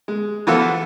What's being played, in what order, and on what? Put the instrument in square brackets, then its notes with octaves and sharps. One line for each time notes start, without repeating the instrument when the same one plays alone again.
[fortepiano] G#3
E3 F3 B3 F4 F#4 A4